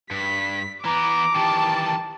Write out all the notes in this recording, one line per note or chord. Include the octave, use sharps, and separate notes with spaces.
G2 B6
E3 B3 A#5 D6
D#3 E3 G4 A5